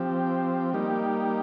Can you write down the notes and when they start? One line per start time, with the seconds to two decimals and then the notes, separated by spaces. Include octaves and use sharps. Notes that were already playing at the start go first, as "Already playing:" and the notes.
Already playing: F3 C4 G4
0.73 G3 A#3 D#4 G4